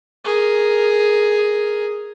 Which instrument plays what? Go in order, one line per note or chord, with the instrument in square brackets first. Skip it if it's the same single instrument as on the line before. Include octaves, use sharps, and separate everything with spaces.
[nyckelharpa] G#4 A#4